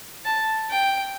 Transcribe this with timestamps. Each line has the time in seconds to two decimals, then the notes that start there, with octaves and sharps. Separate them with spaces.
0.25 A5
0.70 G5